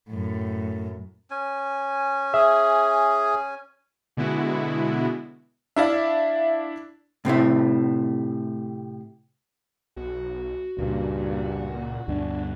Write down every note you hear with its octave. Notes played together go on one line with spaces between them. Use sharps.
F#2 A2
C#4 G#5
G#4 E5
B2 D3 G#3 B3 E4 F#4
D4 E4 D5 E5 F5
A2 C3 A3 E4
B1 F#4
C#2 G2 A#2
D2 G2 B2 D4